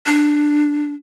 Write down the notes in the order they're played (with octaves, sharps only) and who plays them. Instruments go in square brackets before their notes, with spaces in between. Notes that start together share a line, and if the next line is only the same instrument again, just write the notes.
[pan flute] D4